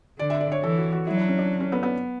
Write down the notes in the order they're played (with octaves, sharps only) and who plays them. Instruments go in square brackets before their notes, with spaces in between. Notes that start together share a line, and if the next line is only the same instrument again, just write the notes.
[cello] D3 [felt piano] D5
[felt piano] E5
D5
C#5
[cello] E3 [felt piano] A4
[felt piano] F#4
F#4
[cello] F#3 [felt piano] E4
[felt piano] D4
C#4
D4
C#4
B3
B3